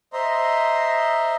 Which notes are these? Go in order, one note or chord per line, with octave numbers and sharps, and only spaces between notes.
C5 D#5 E5 A#5 C6